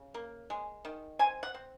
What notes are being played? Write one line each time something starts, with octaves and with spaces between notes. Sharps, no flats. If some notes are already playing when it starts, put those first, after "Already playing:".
Already playing: C#3
A#3
G#3
D#3
C4 G#5
F#5
C4